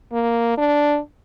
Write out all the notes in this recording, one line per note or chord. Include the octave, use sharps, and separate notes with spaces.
A#3
D4